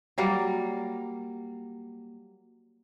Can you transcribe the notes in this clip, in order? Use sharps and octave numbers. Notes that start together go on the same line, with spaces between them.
F#3 G3 A#3